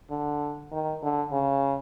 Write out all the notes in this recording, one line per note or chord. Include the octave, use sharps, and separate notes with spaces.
D3
D#3
D3
C#3